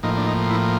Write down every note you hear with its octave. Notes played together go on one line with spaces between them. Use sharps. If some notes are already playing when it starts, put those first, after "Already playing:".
A2 F3 A#3 D#4
D4
D#4
E4